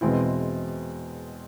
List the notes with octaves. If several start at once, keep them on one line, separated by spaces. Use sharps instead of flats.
E2 B2 G#3 C4 E4